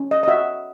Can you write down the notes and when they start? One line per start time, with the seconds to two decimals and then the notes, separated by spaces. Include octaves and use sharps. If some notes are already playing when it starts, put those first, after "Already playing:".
Already playing: C#4
0.11 D#5
0.23 D#5
0.28 F#4 E5